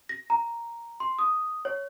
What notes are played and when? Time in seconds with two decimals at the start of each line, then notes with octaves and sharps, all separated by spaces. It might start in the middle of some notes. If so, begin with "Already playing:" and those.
0.09 A#6
0.30 A#5
1.00 C6
1.19 D#6
1.65 C#5